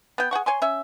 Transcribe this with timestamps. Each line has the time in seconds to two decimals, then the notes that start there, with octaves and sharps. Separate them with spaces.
0.18 B3 G5
0.31 G#4 C5 F#5 C#6
0.46 C#5 G#5 C6
0.62 C#4 E5